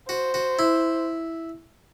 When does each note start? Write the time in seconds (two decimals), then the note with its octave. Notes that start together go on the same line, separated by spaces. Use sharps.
0.09 F#4 C5
0.34 F#4
0.59 E4